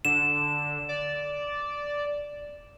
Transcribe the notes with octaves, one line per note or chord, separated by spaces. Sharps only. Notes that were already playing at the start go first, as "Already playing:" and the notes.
D3 E7
D5